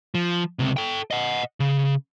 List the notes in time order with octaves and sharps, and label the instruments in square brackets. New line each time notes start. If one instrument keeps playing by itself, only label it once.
[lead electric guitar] F3
C#2 C3
A4 G5
D#5 F#5
C#3